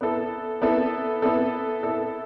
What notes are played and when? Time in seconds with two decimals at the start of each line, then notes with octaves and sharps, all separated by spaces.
0.01 B3 E4 A4
0.62 B3 E4 A4
1.22 B3 E4 A4
1.83 B3 E4 A4